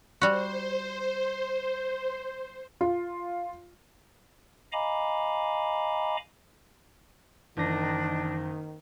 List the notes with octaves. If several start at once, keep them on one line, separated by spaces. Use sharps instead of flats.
G3 F#4 C5
F4
D#5 F5 G#5 A#5 B5 D6
F#1 D#3 E3 D4 A#6